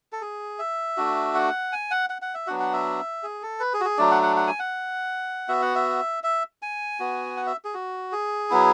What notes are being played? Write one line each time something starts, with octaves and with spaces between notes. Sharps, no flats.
A4
G#4
E5
A3 D4 F#4
F#5
G#5
F#5
F#5
F#5
E5
F#3 B3 D4 F#4 F#5
F#5
E5
G#4
A4
B4
G#4
F#4
G#4
F#3 A3 D4 D5
F#5
F#5
F#5
G#5
F#5
B3 F#4 E5
F#5
E5
E5
G#5
B3 F#4
F#5
E5
G#4
F#4
G#4
F#3 B3 E4